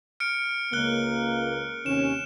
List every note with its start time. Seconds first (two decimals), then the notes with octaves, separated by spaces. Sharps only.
0.20 F6 C#7 D7
0.73 C#2 A#3 F#6 G7
1.86 D#2 C3 C#4 E7